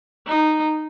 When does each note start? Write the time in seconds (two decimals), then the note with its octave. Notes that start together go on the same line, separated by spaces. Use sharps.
0.27 D#4